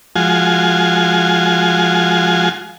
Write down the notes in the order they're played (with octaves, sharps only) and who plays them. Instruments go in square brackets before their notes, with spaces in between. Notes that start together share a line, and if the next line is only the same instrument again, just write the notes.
[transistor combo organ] F3 G#3 F4 F#4 G#5